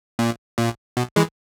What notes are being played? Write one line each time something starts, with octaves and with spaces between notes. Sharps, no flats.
A#2
A#2
B2
E3 G#3